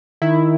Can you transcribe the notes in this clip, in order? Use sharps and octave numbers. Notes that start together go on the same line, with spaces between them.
D#3 E4